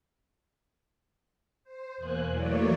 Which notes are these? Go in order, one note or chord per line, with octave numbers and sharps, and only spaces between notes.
C5
E2 B2 A#3 G#5 F#6
E3 F#3 A3 A#3 C#5 D5